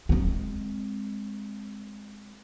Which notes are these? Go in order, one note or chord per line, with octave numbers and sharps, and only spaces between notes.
G#3 C4